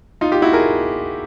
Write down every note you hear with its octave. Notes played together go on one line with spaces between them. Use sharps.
D#4 F4
F4 G4
E4 F#4
G#4 A#4